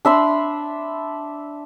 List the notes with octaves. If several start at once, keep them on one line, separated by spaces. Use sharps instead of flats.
D4 E5 B5 C6